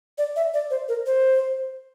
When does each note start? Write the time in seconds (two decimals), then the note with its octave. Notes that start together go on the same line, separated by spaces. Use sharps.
0.18 D5
0.36 E5
0.54 D5
0.70 C5
0.89 A#4
1.06 C5